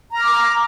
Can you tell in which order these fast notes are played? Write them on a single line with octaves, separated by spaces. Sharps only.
A#5 F6 D6